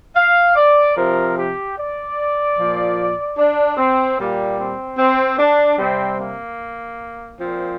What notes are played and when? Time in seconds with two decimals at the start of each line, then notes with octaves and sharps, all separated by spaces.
0.15 F5
0.56 D5
0.95 C3 F3 A#4
1.36 G4
1.76 D5
2.56 A#2 F3
3.37 D4
3.77 C4
4.17 A#2 G3 A#3
4.57 C4
4.98 C4
5.38 D4
5.78 C3 G3 C4
6.18 A#3
7.39 A#2 F3 C4